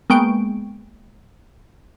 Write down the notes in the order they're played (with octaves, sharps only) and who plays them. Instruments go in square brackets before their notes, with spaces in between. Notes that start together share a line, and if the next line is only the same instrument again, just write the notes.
[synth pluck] G#3 A#3 B3 G5 C#6 D7